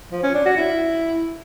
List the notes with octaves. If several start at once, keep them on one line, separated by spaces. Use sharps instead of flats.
F3
C#4
D4
F#4
E4